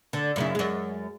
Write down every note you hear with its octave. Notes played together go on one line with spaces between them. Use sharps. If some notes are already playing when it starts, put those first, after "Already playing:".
D3
F#2 C#3 E4
F#2 G#3